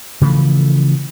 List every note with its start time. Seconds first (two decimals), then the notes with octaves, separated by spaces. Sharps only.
0.21 C#3 E3 F3 A3